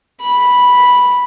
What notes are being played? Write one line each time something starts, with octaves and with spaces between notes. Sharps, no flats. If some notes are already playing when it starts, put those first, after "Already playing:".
B5